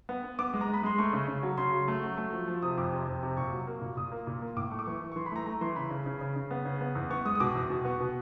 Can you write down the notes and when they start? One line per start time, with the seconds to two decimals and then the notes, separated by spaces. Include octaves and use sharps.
0.09 B3
0.24 B3
0.39 B3 D6
0.54 G#3
0.61 A#5
0.69 G#3
0.74 B5
0.83 G#3 C6
0.98 A3 C#6
1.13 C#3
1.28 C#3
1.43 F#3
1.58 C#3 C6
1.73 F#3
1.88 A3
2.03 F#3
2.17 A3
2.33 F3
2.48 F3
2.62 C3 D#6
2.77 F2 D6
2.92 C3
3.07 F2
3.23 C3
3.37 A#2 C#6
3.52 F#3
3.67 A#3
3.81 A#2
3.97 A#2 D#6
4.12 A#3
4.27 A#2
4.42 A#3
4.56 A2 D6
4.71 A3 C#6
4.79 D6
4.86 E3 C#6
5.01 E3
5.12 C#6
5.16 E3 C6
5.26 B5
5.32 A3 A#5
5.46 A3 A#5
5.61 E3 C6
5.76 C#3 B5
5.90 C#3
6.06 C#3
6.21 C#3
6.36 C#3
6.51 B3
6.65 C#3
6.81 B3
6.95 E2
7.10 B3 C#6
7.25 G#3 D#6
7.35 D#6
7.40 B2 D6
7.55 E2
7.70 B2
7.85 B3 C#6
8.00 B2